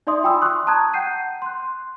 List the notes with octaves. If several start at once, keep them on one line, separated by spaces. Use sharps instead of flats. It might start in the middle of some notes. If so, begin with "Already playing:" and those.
D#4 D5 E5 C6 D#6
F4 G5 G#5 B5 D#6 E6
C6 C#6 D#6 E6 F#6
A5 A#5 D#6 F#6 G#6
F#5 G5 G6 C7 D#7
C6 F#6